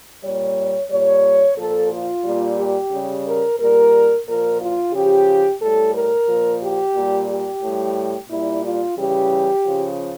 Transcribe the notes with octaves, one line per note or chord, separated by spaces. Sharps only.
A#2 G3 C#5
A#2 G3 C#5
A#2 F3 A4
F4
A#2 G3
G4
C#3 G3
A#4
A#2 G3 A#4
A#2 F3 A#4
F4
C#3 F3 G4
A2 G3 A4
A#4
A#2 F3
G4
A#2 G3
G4
A2 G3
A#2 G3 E4
F4
C#3 E3 G3 G4
C#3 F3